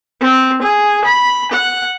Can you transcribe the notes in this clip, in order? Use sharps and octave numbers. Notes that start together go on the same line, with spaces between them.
C4
G#4
B5
F#5